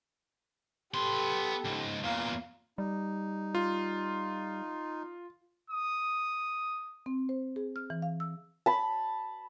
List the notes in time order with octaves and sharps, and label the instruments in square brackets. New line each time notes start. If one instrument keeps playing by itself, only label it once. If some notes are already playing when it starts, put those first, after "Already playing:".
[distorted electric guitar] B3 C6 [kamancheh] G4 A4
[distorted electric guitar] C#2 G#2
[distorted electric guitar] E2 A#2 [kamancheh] F5 A#5
[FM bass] G3 [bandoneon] D#4
[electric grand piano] F4
[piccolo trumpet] D#6
[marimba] C4
C5
G#4
F6
E3
F5
E6
[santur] A5 B5